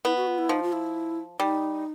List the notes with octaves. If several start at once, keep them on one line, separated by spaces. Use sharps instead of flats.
B3 E4
F#4
F4
E4
F3 D#4
F4
E4
G3 D#4